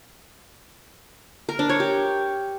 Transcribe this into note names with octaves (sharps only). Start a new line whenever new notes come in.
A#4
D4
C#5
G4